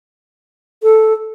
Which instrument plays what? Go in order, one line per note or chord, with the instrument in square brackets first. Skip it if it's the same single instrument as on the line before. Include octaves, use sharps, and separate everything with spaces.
[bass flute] A4